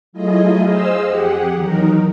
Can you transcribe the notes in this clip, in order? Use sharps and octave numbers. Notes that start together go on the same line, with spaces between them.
F#3 A3 E4 F4 G#4 D#5
G#4 C5 D#5 F5 E6
F2 G4 G#4 F#5
E2 D#3 F#3 D#4 A#4